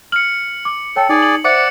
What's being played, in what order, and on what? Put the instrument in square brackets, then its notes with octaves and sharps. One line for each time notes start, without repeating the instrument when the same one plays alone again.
[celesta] F6 [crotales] C#7 F#7
[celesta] D6
[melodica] A4 [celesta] C#5 G5
[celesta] D#4 [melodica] G#4 D5
[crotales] F#7
[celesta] C5 E5 [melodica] D5 F#5 [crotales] D6 C#7